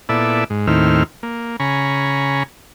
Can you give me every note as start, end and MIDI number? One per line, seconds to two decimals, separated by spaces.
0.09 0.44 46
0.09 0.44 59
0.09 0.44 64
0.09 0.44 69
0.09 0.44 74
0.09 0.44 76
0.50 0.67 44
0.67 1.03 39
0.67 1.03 45
0.67 1.03 51
0.67 1.03 60
0.67 1.03 64
0.67 1.03 89
1.23 1.56 58
1.60 2.43 49
1.60 2.43 80
1.60 2.43 82
1.60 2.43 83
1.60 2.43 85